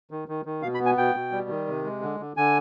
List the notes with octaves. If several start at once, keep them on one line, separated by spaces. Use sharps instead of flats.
D#3
D#3
D#3
B2 F5
B5
B3
G#5
B2 G5
B2
G3
D#3
C3
G#3
D3
D3
D3 G#5